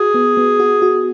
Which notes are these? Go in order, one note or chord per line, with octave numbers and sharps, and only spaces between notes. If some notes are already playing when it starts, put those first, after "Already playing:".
Already playing: F#4 G#4
B3
B3
F#4
F#4